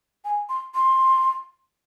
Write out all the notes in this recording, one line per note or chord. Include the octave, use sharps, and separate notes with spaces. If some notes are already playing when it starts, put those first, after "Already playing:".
G#5
C6
C6